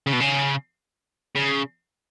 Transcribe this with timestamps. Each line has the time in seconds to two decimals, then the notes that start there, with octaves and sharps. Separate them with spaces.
0.07 C#3
0.13 B2
0.20 C#3
1.35 C#3